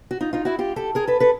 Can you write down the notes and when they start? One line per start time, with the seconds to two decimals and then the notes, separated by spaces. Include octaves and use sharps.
0.11 F#4
0.21 D#4 F4
0.33 D#4 F4
0.45 E4 F#4
0.59 F4 G4
0.76 G4 A4
0.95 G#4 A#4
1.07 A4 B4
1.20 A4 B4